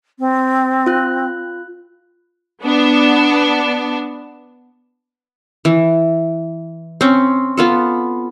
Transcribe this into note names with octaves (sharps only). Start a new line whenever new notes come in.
C4
F4 F#6
B3 D4
E3
C4 C#4
B3 F4 A4